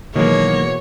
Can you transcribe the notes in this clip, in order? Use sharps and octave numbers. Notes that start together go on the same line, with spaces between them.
B2 D#3 E3 F#3 G#3 A#3 C#5